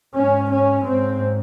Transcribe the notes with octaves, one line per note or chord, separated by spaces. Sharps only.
G#2 C#4
C#4
G#2 C4